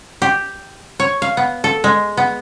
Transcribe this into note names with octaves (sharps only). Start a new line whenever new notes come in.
G4
C#5
F5
B3
A4
G#3
B3